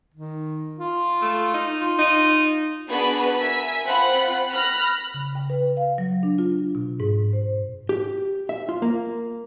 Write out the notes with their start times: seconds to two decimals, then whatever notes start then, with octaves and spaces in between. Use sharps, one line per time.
0.14 D#3
0.79 F4
1.22 A3
1.54 D#4
1.80 F4
1.99 D#4
2.89 B3 D4 F#4 G#4 B4 B5
3.39 A#4 E5 G#5 B6
3.85 C4 F4 F#5 B5 F#6
4.52 B5 F6 F#6 A#6
5.14 C#3
5.35 G5
5.50 B4
5.77 F5
5.98 F#3
6.23 D4
6.38 F4
6.75 B2
7.00 G#2
7.33 C5
7.89 G4
8.49 E5
8.69 F4
8.82 A#3